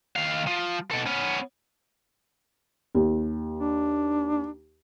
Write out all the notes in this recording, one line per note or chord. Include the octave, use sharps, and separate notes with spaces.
D#3 F5
F3
B2 A4
B3 C#4
D#2
D4